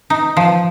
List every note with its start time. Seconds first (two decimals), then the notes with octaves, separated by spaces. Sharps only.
0.10 D#4
0.37 F3